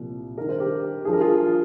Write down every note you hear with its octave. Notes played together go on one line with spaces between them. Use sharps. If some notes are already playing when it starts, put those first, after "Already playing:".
Already playing: C2 A#2 F3
G2 D#3 A#4
C5
G4 A#4
G2 F3 G#4
A#4
F4 G#4